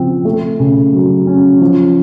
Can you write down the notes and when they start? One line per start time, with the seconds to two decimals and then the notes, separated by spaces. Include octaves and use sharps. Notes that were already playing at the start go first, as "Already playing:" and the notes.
Already playing: C#3 F3 C4
0.25 A3
0.60 C#3
0.93 F#3
1.27 C#4
1.61 F3